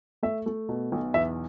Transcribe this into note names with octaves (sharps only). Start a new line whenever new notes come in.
A3 E5
A3
B2
B1
E2 E5